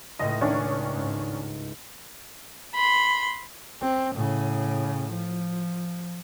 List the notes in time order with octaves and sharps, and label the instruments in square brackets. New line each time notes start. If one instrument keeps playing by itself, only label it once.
[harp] C#2 A2 [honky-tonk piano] D#5
[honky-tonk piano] D#3 C#4 D4
[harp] G#2
[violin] B5 C6
[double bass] C4
A2 C#3
F3